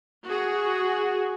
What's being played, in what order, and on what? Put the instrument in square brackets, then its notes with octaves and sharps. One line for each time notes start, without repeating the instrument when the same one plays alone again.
[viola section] F#4 G#4